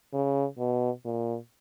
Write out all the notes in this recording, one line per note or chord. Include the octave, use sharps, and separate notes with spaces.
C#3
B2
A#2